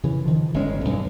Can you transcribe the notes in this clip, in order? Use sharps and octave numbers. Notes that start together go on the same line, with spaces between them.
C#3 E3
D#3 F3
G1 A2 G#3 C#4
B1 G2